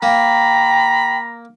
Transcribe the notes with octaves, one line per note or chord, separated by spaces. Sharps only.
A#3 G5 A#5 B5